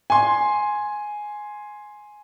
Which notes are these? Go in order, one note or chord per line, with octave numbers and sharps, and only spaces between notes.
G#5 C6